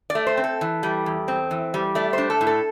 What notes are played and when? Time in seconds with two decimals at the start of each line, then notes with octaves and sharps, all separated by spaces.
0.10 D5
0.15 A3
0.27 C5
0.37 C4
0.44 A4
0.61 E3
0.83 G3
1.06 E2
1.28 C4
1.51 E3
1.74 G3
1.95 A3 D5
2.13 D4 C5
2.30 A4
2.41 A2
2.47 A4